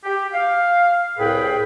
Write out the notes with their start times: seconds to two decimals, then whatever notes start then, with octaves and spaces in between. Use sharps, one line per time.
0.04 G4
0.33 F5
1.19 C2 A2 G#4 B4 G5